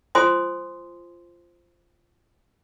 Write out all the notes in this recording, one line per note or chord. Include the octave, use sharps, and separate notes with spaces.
F4 C5 G#5 C6 D#6